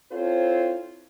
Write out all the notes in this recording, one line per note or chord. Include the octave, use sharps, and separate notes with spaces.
C4 E4 F4 A4 C5 C#5